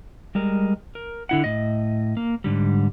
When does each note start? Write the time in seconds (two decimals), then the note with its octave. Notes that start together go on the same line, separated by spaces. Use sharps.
0.35 G3 G#3 A#4
0.95 A#4
1.29 D3 E4 F#5
1.44 A2 D#5
2.17 A#3
2.44 G#2 D3 G3